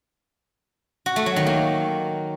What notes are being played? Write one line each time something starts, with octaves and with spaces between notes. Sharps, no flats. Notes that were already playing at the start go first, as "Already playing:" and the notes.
F#4
A3
F#3
D#3
A#3